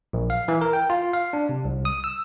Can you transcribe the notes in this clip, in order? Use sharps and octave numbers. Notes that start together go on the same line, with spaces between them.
A#1
F5
E3
A#4
G5
F4
F5
D4
C3
C2
D#6
E6